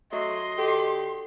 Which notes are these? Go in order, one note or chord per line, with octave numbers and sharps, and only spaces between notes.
F#3 A3 F#4 D#5 C6
D3 G4 A4